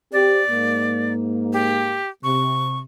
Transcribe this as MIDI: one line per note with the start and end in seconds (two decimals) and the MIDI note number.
0.12 0.42 60
0.12 0.42 67
0.12 1.13 74
0.50 1.99 44
0.50 1.99 58
1.53 2.09 67
2.24 2.82 48
2.24 2.79 85